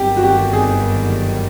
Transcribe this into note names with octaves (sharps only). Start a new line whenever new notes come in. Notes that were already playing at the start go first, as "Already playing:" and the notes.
Already playing: G1 F#2 D#3 G3 G4
F#4
G4
G#4